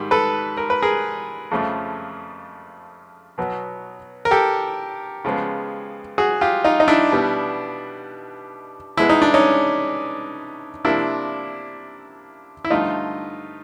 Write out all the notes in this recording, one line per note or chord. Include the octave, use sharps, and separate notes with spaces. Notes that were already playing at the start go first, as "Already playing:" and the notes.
Already playing: G#2 D#3 G3
A4 B4
A#4
B4
G#4 A#4
F2 C#3 F3 A3
B2 F#3 B3
A#4
G4 A4
C#3 F3 G#3 B3
F#4 G#4
F4 G4
D#4 F4
D#4
D4 E4
B2 G3 B3
B2 G#3 B3 E4
D#4
D4
C#4 D#4
C3 F3 A#3 D4 E4
E4
G2 D3 F3 A3 D#4 F4